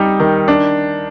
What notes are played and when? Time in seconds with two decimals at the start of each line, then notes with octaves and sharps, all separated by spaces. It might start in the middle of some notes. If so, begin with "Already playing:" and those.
Already playing: G3 D#4
0.20 D#3
0.48 D4